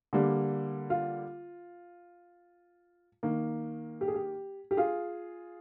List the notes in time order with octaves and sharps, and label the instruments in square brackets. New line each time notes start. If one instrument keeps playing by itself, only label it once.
[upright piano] D3 G3 A#3
F4
D#3 A#3
G4
G#4
G4
G4
F4 G#4